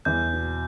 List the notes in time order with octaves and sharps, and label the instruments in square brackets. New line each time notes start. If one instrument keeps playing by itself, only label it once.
[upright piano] E2 [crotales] G6
[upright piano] B2